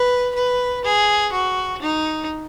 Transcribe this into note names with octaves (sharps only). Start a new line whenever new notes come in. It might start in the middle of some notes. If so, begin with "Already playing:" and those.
Already playing: B4
B4
G#4
F#4
D#4